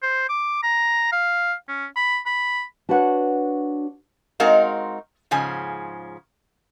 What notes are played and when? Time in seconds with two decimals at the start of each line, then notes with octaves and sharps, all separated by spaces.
0.02 C5
0.29 D6
0.63 A#5
1.12 F5
1.68 C#4
1.96 B5
2.26 B5
2.89 D4 F#4 B4 C#5 F#5
4.40 G#3 C4 D#4 F#4 A#4 F5
5.31 G#2 C#3 F3 G#5